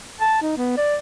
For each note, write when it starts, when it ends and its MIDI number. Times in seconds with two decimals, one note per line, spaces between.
0.20 0.40 81
0.42 0.57 63
0.57 0.75 59
0.78 0.96 74